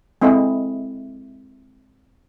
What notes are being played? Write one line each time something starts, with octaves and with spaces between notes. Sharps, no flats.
G#3 C4 E4 A4 D#5